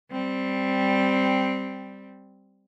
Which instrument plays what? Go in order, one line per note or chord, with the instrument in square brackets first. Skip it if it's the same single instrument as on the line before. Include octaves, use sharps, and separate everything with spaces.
[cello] G3 C4